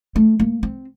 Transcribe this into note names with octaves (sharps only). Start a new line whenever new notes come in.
A3
A#3
C4